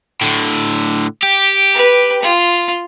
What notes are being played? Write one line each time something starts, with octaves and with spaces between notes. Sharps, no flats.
A2 D3
G4
B4
F4